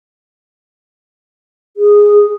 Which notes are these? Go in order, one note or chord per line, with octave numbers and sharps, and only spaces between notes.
G#4